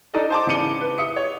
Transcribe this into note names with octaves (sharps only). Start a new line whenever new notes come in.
D4 D#4 A4 D5 D#5
C5 A5 D6
G#2 C#3 E3 C#7 D#7 G7
B4
E5 D#6 C#7
C#5